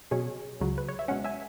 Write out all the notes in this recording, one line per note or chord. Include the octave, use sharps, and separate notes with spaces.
B2 F#3 C#4 G#4 C#5
C#2 C#3 F#3
B4
C#5
E5
B2 G#3 C#4 C#5 F#5
E5 G#5